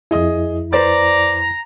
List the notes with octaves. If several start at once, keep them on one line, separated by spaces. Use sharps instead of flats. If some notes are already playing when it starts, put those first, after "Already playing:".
F2 E4 G#4 D#5 D#6
B4 C5 D5 A#5 A6